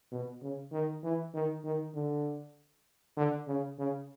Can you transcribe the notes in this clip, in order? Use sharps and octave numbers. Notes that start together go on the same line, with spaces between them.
B2
C#3
D#3
E3
D#3
D#3
D3
D3
C#3
C#3